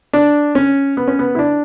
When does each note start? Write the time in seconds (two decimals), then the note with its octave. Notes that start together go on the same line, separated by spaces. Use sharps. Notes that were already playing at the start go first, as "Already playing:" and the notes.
0.13 D4
0.55 C#4
0.97 B3
1.08 C#4
1.19 B3
1.35 E4
1.39 D4